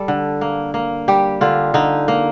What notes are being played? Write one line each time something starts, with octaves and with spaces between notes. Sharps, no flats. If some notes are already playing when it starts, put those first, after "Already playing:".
Already playing: G3 A4
D3
A#3
A#3
G3 G4
D3 F4
D3 D#4
A#3